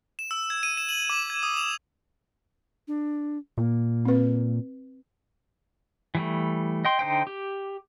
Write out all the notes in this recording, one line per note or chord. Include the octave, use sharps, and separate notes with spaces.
E7
E6
G#6
D#7
E7
F#7
D6
G#6
D#6
F7
D4
A#2 A#3
C4 B4
E3 G3 A3
D#5 G5 C6
D3 D#4 C5 G5
G4